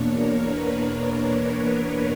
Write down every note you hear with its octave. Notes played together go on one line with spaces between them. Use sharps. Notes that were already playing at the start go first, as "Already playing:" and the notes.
Already playing: E2 B2 A#3 D4 C#5
A#4
B4
C#5